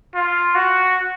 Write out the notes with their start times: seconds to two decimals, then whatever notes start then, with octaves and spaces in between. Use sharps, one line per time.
0.15 F4
0.55 F#4